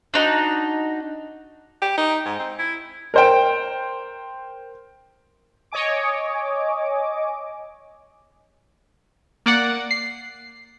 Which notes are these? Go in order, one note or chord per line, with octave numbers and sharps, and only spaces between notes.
D4 D#4 F#4
G4
D#4
G#2
C4
E4
A#4 C5 G5
C#5 D#5 G#5 D6
A#3 D5 F#5
C7